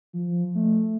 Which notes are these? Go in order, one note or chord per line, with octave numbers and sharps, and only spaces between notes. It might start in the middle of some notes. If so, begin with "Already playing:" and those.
F3
A3